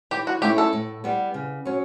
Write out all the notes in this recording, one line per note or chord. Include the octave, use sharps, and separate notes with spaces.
E3 G4
F#4
A3 C#4 E4 G4
A4
A2
G3 B3
C#3
F#3 C#4